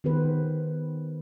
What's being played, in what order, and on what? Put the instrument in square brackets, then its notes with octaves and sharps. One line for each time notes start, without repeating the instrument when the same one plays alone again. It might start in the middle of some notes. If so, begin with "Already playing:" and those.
[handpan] D#3 B3 G4 B4 C5